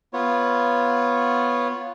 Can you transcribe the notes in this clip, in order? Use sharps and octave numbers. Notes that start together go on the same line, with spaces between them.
B3 F4 C#5